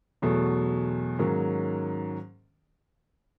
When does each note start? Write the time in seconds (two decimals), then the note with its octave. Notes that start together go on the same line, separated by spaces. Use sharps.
0.22 E2 B2 F#3 A3
1.19 G#2 D#3 F#3 A#3 C#4